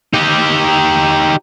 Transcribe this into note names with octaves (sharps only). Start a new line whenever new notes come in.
D#4 G4